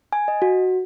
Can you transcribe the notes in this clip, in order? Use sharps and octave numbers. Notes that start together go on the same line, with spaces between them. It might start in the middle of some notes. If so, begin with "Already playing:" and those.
G#5
D#5
F#4